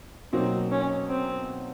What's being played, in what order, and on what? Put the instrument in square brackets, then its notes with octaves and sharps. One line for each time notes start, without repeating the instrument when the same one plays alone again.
[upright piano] B2 F#3 A#3 D#4 [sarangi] C4
[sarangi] C#4
C4